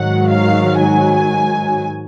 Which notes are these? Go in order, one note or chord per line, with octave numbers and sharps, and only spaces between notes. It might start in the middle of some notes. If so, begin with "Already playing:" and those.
Already playing: G#2 D#3 F#3 F#5
F5
G#5